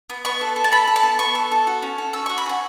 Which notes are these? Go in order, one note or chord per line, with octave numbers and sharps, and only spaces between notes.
B3
B3 C#6
A4
A4
A5
A4 B5
A4
A5
B3
B3 C#6
A4
A4
F#4
C#4
A4
C#4 E6
F#4 C#6
B5
C#4 F#5